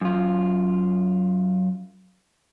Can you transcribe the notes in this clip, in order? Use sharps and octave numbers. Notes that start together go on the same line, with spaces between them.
F#2 F4